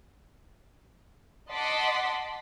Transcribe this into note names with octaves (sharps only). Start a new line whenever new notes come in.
D#5 F#5 A5 C6 D6 B6